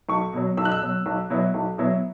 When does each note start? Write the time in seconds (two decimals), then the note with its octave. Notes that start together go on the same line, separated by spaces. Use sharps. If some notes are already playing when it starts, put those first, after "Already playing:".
0.09 B1 C#6
0.33 B2 F#3
0.57 B1 E6
0.65 F#6
0.72 E6
0.82 B2 F#3
1.06 B1
1.30 B2 F#3 B3 E4
1.54 B1
1.78 B2 F#3 B3 E4